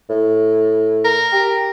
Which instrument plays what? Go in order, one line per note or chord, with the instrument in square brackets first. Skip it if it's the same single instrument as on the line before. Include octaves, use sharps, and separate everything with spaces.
[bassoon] A2
[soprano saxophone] A#4
[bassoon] G4